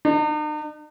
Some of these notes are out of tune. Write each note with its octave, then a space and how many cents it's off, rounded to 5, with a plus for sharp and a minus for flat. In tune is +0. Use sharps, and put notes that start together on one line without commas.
D#4 -45